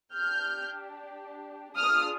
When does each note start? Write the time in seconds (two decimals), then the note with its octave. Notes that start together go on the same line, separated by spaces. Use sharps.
0.14 D4 G4 F6 G6
1.77 D4 F4 G#4 D#6 F6